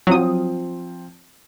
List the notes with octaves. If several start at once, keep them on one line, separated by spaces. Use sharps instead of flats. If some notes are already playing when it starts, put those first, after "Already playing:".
F3 F#3 C4 F4 D#6